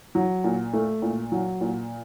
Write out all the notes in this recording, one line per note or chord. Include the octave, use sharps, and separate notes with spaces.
F#3
A#2
A3
A#2
F#3
A#2